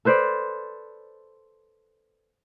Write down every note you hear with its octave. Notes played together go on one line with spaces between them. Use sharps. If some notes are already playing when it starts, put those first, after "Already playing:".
A4 B4 C5 D5